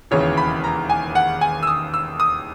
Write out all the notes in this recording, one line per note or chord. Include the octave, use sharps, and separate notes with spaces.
E1 D#2 C#3 E3 C#5
B5
A#5
G#5
F#5
G#5
E6
D#6
E6
D#6